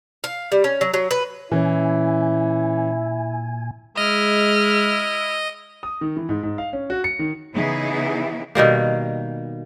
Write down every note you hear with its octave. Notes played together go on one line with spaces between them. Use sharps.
F5
G3
C#4
F#3
F#3
B4
A#2 E3 C#4 E4 G#5
G#3 E4 D#5 F6
D#6
D#3
E3
G#2
G#2
F5
C#4
F#4
C#7
D#3
C#3 E3 B3 D#4 E4 G#4
B2 D#3 G3 A#3